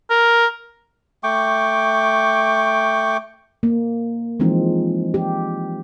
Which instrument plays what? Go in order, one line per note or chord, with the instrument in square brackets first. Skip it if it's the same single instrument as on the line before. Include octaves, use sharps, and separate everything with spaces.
[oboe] A#4
[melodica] A3 G5 C#6 D6
[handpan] A#3
E3 F3 G#3 C4 D#4
G4